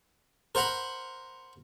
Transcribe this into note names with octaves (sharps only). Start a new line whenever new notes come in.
A#4 C5 F#5 A#5 B5